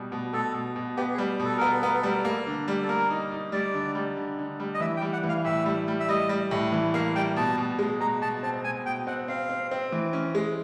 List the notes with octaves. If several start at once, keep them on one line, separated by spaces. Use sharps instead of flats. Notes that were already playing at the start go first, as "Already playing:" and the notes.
Already playing: B2 G3
B2
B2 A4
B2
B2
B3 G4
G#4
G3
B2
A4
B3 A#4
A4
B3 A#4
A4
G3 A#4
A4
A#3
D3
G3
A4
A#3 A#4
D#4
D#4
G3 D5
D3
G3
D3
D3
G3
D#5
E3 E5
G5
G3
F#5
E3
F5
A2 E5
G3
G3
E5
G3 D#5
G3
A2
E3
A#3 F5
G3 G5
B2 A5
B2
G#3
B2 A#5
B2 A5
C4 A5
B2 G#5
B2 G5
C4 F#5
C4 F5
C4
C4
E3
C#4
G#3